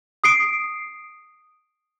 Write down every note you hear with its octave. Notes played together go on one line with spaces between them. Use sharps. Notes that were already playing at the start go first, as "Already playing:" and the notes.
D#6 C7 D7